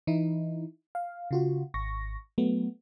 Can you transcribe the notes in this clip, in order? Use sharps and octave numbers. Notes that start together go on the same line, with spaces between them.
E3 D#4 E4
F5
C#3 F4 F#4
G#1 C#6 A#6
F#3 A3 B3